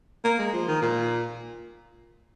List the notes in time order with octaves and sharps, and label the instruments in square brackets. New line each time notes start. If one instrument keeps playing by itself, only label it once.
[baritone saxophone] A#3
G#3
F3
D#3
A#2